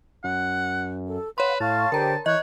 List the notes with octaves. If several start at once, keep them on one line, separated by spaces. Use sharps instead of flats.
F#2 F#5
A4
B4 C#5 F5 F#5 C6
A2 F5 A5 C#6 F6
D3 G4 A#4 C5 G5 A#5
E3 C#5 D#5 F#6 G6